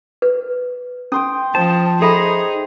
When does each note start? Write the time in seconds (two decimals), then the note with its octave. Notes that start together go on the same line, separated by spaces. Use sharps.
0.22 B4
1.12 C#4 G5 C6 D#6
1.55 F3 C5 A5
2.02 D#4 G#4 A4 E5 B5